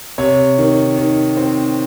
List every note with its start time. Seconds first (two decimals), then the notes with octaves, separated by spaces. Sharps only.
0.18 C3 C#5
0.58 D#3
0.97 D#3
1.37 C4